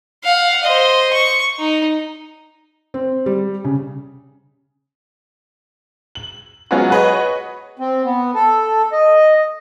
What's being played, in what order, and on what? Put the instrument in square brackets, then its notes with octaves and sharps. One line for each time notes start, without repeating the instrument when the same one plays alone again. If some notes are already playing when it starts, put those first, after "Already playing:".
[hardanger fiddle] F5 F#5
C5 D#5
C#6
D#4
[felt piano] C4
G3
C#3
[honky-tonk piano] F#7
F#3 G#3 B3 C#4 F4 F#4
F#4 G#4 B4 C#5 D#5
[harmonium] C4
B3
A4
D#5